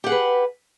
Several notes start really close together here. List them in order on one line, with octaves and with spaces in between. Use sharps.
G4 F#5 G#4 B4